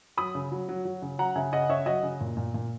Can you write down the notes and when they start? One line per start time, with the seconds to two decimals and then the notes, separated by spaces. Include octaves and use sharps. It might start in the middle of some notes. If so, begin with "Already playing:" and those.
0.17 F#3 B5 D#6
0.35 C#3
0.52 F#3
0.69 F#3
0.85 F#3
1.02 C#3
1.18 F#3 F#5 A#5
1.35 C#3 E5 G#5
1.53 C#3 D#5 F#5
1.69 C#3 C#5 E5
1.86 F#3 D#5 F#5
2.03 C#3
2.21 A#2
2.37 A#2
2.54 A#2